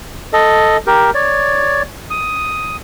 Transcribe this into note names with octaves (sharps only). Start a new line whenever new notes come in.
A4 D#5
G4 A#4
C#5 D5
D#6